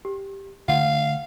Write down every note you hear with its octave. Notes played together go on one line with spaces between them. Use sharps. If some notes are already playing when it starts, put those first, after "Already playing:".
G4
D3 A3 F5 F#5